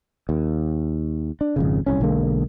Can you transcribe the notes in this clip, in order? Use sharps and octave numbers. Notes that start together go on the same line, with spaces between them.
D#2
D4
G#1 F2 C#3
D1 C2 C#4
B1 D3 G#3 A#3